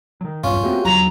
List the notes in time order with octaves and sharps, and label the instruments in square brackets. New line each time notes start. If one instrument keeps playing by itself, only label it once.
[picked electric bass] D#3 F#3
[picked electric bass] B1 E2 A#2 [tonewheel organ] G2 [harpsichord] C#4 F4
[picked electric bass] A3 A#3 C4 [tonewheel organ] F#4 G4
[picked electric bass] E2 D3 [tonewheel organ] F#3 [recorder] A#5